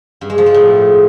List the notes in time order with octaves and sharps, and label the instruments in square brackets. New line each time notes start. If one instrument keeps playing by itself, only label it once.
[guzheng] G2
G#3
F3
G#3
A2